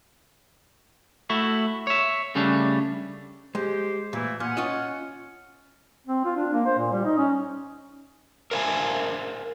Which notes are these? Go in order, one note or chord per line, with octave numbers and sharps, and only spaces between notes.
A3 E4 F#4
C#5 E5
C#3 G3 A3 C#4 D4
G#3 G4 C5
A#2 E3 A3 E4
A#2 F#5 G#5 F6
C#4 F4 D#5
C4
F4
D4
A#3
C5
A#2
G3
D#4
C#4
A#4 C5 E5 F5 G#5